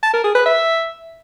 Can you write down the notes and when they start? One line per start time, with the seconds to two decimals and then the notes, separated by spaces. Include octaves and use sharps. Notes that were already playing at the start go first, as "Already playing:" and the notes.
0.03 A5
0.13 A#4
0.24 G#4
0.35 B4
0.45 E5